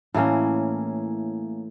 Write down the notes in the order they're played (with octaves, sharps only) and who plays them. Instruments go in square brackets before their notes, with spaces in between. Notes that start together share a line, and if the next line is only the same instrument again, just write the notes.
[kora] A2 E3 A#3 C#4